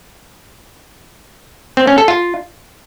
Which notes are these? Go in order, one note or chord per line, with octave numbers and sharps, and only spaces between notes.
C4
C#4
A4
F4